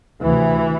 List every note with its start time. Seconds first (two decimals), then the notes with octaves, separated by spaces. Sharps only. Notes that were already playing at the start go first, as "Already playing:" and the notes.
0.20 D2 C3 E3